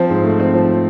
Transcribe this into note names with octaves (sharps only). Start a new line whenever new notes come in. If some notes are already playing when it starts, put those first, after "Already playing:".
Already playing: F3 C4
G#2
A3
C4
F3